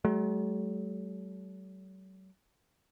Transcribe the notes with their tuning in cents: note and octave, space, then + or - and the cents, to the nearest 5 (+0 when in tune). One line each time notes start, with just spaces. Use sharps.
F#3 +40 A3 -45